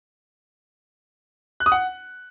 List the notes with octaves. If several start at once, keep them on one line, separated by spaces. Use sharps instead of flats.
F#6
D#6
F#5